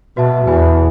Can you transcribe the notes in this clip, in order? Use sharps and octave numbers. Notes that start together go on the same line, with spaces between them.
B2 F#4 B4 E5 A5
E2 B4 E5 G#5 B5